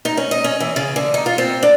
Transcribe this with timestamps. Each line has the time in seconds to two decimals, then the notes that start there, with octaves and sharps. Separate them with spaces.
0.05 D#4
0.17 C#4
0.31 D#5
0.44 C#4
0.60 E3
0.76 C#3
0.96 D3
1.14 D#4
1.26 F4
1.38 C4
1.63 D4